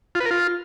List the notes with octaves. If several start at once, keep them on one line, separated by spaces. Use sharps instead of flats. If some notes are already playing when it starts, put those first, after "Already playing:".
F4
B4
A#4
F4